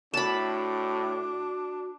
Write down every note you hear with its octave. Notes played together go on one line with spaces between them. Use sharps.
A2 D4 F#4 A5 B5